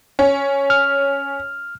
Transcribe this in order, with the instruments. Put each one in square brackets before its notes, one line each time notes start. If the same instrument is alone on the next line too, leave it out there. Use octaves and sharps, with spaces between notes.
[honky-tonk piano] C#4
[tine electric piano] F6